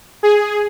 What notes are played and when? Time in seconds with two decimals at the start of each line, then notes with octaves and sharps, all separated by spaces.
0.23 G#4